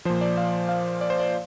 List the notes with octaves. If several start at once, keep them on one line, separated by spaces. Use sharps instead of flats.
A#2 F3 C5
D5
F5
F5
D5
C5
D5